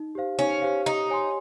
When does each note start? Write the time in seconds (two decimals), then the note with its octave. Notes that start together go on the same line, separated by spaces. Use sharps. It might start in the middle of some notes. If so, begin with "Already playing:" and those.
Already playing: D#4
0.15 G4 C5 F5
0.39 C#4 D#4
0.62 G4 C5 F5
0.86 D#4 G4
1.09 C#5 G#5 C6